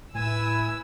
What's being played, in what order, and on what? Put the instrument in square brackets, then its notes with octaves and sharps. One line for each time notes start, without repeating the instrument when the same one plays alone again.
[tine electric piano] A2 [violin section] E4 B4 E6 [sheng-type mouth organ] G#5